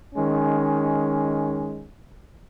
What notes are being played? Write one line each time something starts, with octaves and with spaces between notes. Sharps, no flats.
D#3 G#3 C#4